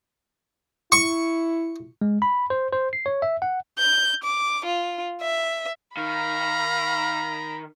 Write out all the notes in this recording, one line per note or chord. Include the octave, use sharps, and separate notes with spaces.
E4 C#6
G#3
B5
C5
C5
C7
C#5
E5
F#5
G6
D6
F4
E5
D#3 F5 A#5 B5